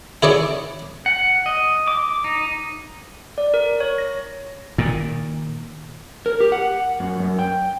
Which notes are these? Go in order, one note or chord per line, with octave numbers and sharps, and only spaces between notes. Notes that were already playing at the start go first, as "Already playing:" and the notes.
E4 G#4 C#5 D5
F#5
D#5
D6
D#4
D5
A#4
C#5
A#6
A#2 D#3
A#4
G4
F#5
F#2
F#2
G5